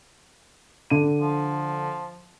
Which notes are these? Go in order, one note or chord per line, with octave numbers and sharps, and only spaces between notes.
D3 D#7
F3